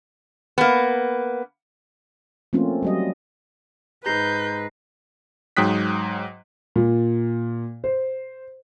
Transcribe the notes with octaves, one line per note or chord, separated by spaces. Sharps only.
A#3 B3
F3 A3 A#3 C4 C#4 F4
F#3 G3 D#5
G#2 G#3 B4 A#5 G6 A#6 C7
G#2 F#3 G5 D#6 F#6 B6
A#2
C5